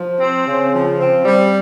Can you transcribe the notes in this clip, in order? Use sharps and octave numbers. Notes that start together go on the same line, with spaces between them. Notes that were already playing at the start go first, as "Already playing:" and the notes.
Already playing: F3
C4
C#3
F3
C4
G3